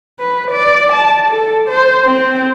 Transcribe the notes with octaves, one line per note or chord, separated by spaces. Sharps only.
B4
D5
A5
A4
C5
C4